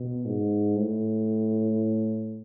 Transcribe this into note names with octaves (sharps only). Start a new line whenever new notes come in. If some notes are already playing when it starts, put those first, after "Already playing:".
Already playing: B2
G#2
A2